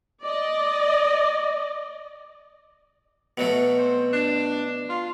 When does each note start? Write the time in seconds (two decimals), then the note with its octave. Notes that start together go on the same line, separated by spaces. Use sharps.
0.23 D5 D#5
3.38 B2 F#3 A3
3.78 C4
4.13 D4
4.89 F4